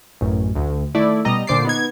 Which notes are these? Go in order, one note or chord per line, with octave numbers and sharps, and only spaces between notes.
A1 F#2
D2
D#3 A3 E4 D5
B2 G3 D#5 A#5 D#6
A#2 D3 C5 D6 A6 C7
B3 D#4 G#6